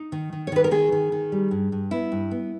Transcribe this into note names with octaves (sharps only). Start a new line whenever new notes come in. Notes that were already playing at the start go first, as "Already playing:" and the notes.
Already playing: D#4
D#3
D#3
C#5
D#3 B4
A#4
D#3 G#4
D#3
D#3
G3
G2
G2
B3 E4
G2
B3